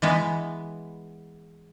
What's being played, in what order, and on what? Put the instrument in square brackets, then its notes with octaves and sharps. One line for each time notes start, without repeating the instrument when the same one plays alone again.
[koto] E3 G#3 B3